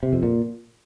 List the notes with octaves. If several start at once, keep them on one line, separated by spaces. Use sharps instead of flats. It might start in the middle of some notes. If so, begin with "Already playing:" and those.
C3
F2
A#2